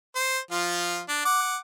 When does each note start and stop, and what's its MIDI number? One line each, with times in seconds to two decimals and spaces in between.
0.15 0.39 72
0.51 1.01 53
0.51 1.01 65
1.09 1.20 62
1.25 1.57 78
1.25 1.57 86